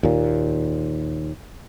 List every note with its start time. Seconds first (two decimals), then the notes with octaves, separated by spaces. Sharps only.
0.03 D#2 A#2